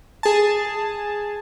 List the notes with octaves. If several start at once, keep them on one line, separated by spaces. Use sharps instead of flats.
G#4 A5